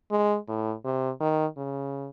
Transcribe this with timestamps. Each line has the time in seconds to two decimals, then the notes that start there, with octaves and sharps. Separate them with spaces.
0.11 G#3
0.48 A2
0.85 C3
1.20 D#3
1.57 C#3